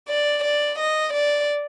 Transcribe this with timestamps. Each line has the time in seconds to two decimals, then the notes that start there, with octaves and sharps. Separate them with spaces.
0.08 D5
0.44 D5
0.79 D#5
1.14 D5